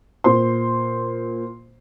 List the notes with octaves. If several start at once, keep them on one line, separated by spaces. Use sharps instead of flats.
A#2 C5 C6